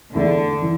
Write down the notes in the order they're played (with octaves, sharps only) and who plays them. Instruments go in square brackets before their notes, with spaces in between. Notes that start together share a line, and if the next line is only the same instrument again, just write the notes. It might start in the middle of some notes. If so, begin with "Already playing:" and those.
[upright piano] E2 E3 A3 E4 [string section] D3
[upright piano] E3